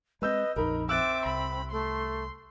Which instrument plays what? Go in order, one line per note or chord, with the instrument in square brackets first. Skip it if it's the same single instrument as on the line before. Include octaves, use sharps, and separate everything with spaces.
[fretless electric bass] G#3 B3 C4 [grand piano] B4 E6 G6 [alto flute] D#5
[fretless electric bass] A#1 F2 [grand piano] D#4 A#4 [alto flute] B5
[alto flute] C4 [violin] E5 D6 [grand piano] E6 F#6 A6
[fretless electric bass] C2 [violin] B5
[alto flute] A3 [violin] C6